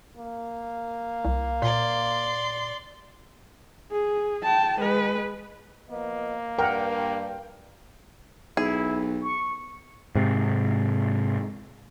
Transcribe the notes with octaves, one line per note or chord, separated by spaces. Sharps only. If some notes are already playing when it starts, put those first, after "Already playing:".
A#3
C2
A#2 D5 C6
G#4
G5 A5
G#3 B4
F3 A#3 B3 D#5
G2 A#4 F#5 G5
B1 E4 G#4
C#6
G#2 C3